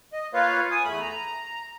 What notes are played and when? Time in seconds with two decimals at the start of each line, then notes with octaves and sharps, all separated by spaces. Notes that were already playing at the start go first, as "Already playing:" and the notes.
0.13 D#5
0.34 A#3 F4 B4 C#5 F5
0.71 G#5 D#6
0.84 E2 A3 B5
1.00 A#5